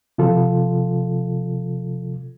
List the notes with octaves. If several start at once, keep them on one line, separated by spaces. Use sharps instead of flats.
C3 F3 F4 A4